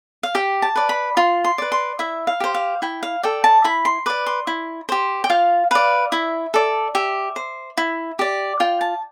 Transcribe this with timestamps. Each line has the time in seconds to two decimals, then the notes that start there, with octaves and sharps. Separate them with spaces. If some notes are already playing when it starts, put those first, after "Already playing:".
0.23 F5
0.35 G4 G5
0.62 A5
0.76 B4 D5
0.89 B5
1.17 F4 C6
1.44 C6
1.58 B4 D5
1.72 C6
1.99 E4 E5
2.27 F5
2.40 G4 C5
2.54 F5
2.82 E4 G5
3.03 F5
3.23 A4 D5 G5
3.44 A5
3.64 E4 B5
3.85 C6
4.06 B4 D5 D6
4.26 C6
4.47 E4
4.89 G4 C5
5.24 G5
5.30 F4 F5
5.71 B4 D5 F5
6.12 E4 E5
6.54 A4 D5
6.95 G4 E5
7.36 C5
7.77 E4
8.19 G4 D5
8.60 F4 G5
8.81 A5